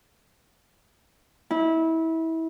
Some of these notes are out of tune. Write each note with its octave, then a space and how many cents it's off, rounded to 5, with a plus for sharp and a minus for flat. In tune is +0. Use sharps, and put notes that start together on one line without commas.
E4 -25